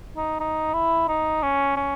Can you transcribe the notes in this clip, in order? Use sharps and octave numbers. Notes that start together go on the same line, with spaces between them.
D#4
D#4
E4
D#4
C#4
C#4